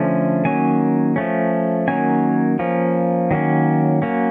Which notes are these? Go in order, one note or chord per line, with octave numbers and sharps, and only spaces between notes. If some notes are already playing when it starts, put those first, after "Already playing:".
Already playing: D3 F3 A3 C#4
D#3 F#3 A#3 C#4 G#5
F3 A3 C#4
D#3 F#3 A#3 C#4 G#5
F3 A#3 C#4
D#3 F#3 A#3 C#4
F#3 A#3 C#4